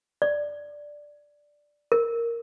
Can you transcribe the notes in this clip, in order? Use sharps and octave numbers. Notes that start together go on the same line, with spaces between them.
D5
A#4